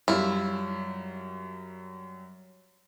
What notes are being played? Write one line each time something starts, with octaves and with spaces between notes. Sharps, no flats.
F#2 G3 E4 F4